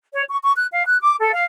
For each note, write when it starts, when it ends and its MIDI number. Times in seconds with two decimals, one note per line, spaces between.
0.13 0.23 73
0.28 0.37 85
0.42 0.52 85
0.56 0.66 90
0.71 0.84 77
0.86 0.98 90
1.01 1.14 86
1.19 1.31 69
1.33 1.44 77